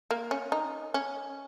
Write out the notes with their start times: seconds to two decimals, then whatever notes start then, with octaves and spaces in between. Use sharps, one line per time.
0.11 A#3
0.31 C#4
0.52 D#4
0.94 C#4